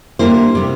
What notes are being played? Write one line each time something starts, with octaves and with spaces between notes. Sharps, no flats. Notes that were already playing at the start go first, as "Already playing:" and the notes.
D3 G3 A#3 E4 C5
C3 G3